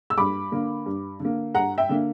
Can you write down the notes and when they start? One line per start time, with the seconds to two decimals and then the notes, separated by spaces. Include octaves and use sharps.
0.10 E6
0.17 G2 B5 D6
0.52 D3 A#3
0.86 G2
1.20 D3 A#3
1.54 G2 F#5 A#5
1.78 E5 G5
1.89 D3 A#3